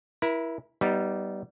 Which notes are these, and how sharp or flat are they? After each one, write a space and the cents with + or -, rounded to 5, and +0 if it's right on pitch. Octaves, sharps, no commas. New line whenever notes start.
E4 +0 A#4 +40
G3 -15 B3 +0 D#4 +15